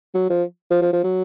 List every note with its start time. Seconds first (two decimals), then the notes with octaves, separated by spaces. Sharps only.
0.14 F#3
0.29 F3
0.70 F3
0.81 F3
0.93 F3
1.04 F#3